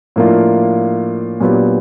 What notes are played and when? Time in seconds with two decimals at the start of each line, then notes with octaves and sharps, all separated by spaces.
0.16 A2 F3 A#3 D4 F4
1.40 A#2 F#3 B3 D4 G4